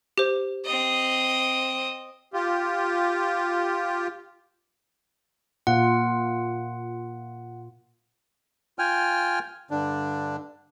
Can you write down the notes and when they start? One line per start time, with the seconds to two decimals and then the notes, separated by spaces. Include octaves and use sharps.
0.18 G4 C5
0.65 C4 D#5
2.34 F4 G4
5.67 A#2 F4 F#5
8.79 F4 G5 G#5 F6
9.71 G2 D3 D4